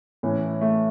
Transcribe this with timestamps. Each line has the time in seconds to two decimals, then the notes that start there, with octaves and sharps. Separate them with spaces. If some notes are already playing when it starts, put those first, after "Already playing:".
0.23 A2 E3 C#4
0.61 A3